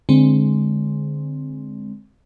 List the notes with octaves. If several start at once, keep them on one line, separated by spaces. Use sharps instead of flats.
D3 G#3 C4